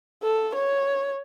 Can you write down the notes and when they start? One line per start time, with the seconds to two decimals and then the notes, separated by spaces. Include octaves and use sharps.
0.23 A4
0.55 C#5